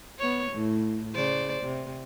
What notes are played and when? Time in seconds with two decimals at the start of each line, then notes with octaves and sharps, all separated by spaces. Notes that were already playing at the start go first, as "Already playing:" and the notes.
0.19 B3 C#5
0.51 A2
1.14 C#3 C5 D5
1.63 C3